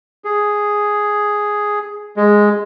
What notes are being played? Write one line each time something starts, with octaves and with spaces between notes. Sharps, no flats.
G#4
G#3